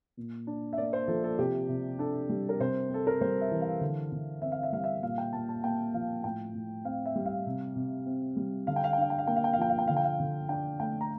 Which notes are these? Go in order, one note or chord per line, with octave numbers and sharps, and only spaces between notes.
A#2
D4
E5
A#3 D5
C5
F3 A4
A4
C3 G4
C3
D4 A4
G3
A#4
C3 C5
C4 A4
A#4
G3 C5
E5
E3
F5
D3
D3
C4 E5
F5
E5
G3 F5
E5
A#2 F5
G5
A#2 A5
A5
A#3 G5
F3 F5
A2 G5
A2
C4 F5
E5
G3
F5
C3
C3
C4
G3
D3 F5
G5
F5
G5
D4 F5
G5
F5
A#3 G5
F5
G5
F5
F3 G5
F5
G5
D3 F5
G5
F5
D3
D4 G5
A3 G5
A#5